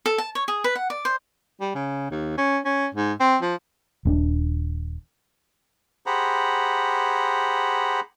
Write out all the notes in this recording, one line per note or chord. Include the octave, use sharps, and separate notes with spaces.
A4
A5
C#5
G#4
B4
F#5
D5
C5
G3
C#3
D#2
C#4
C#4
G#2
C4
F3
D#1 C4 D4
G4 G#4 C5 F#5 A#5 B5